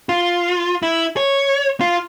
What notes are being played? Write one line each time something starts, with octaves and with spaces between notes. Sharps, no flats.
F4
E4
C#5
F4